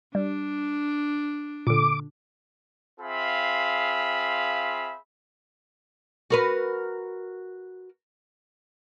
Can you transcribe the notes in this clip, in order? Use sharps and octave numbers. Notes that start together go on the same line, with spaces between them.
G3 D4
A#2 D3 D6
C4 F4 G#4 E5 F5 B5
F#4 A#4 B4